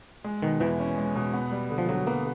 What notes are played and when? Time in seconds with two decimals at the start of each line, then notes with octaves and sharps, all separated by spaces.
0.24 G#3
0.42 B2 D#3
0.60 E2 E3
0.79 C#4
0.98 G#3
1.15 B2
1.34 B3
1.51 G3
1.70 D3
1.78 F3
1.89 D3 F#3
2.07 A#3 B3